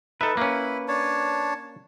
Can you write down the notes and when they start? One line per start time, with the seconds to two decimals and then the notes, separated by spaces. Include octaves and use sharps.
0.21 D#4 A4 B4 E5
0.37 A#3 C#4 E4 B5
0.88 D4 C#5 A5